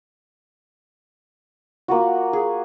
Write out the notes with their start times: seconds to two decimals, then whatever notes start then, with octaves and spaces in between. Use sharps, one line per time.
1.88 A#3 F4 F#4
2.33 G#4